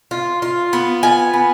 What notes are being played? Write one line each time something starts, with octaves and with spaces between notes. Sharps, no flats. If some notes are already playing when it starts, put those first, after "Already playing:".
F4
F4
B3
F4 G#5
B3